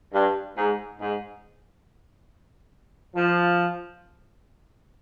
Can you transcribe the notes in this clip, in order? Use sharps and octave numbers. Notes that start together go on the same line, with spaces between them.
G2
G#2
G#2
F3